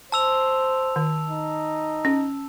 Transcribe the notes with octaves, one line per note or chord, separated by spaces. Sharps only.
C5 A5 E6 F7
D#3
D#4
C#4